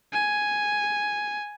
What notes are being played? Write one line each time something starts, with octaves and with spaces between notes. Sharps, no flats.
G#5